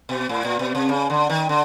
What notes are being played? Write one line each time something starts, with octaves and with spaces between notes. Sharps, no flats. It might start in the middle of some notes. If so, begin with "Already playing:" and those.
B2
A2
A#2
B2
C3
C#3
D3
D#3
D3